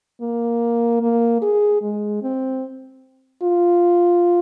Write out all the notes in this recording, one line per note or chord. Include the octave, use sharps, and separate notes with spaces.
A#3
A#3
G#4
G#3
C4
F4